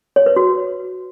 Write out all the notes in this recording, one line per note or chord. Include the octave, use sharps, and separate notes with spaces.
C#5
B4
F#4